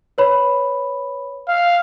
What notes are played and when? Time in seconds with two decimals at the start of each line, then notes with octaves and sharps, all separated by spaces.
0.18 B4 C#5 B5
1.48 F5